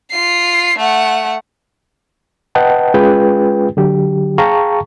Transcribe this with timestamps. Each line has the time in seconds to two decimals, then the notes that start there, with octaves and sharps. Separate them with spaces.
0.11 F4 C7
0.78 A3 F#5
2.55 B4 D#5 F#5 G5 A5
2.94 G#3 C#4 F4 G#4 B4 G5
3.77 D3 F#3 G4
4.38 G#4 F5 G5 A5 A#5 C#6